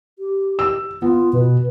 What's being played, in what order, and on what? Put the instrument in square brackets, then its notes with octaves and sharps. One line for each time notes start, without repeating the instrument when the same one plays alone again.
[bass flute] G4
[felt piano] E6
[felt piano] B3 [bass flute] F4
[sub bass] B2 [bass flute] B4